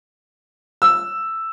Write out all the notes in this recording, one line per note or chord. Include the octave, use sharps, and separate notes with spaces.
E6